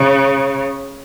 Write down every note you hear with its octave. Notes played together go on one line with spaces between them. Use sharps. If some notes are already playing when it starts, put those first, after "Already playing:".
Already playing: C#3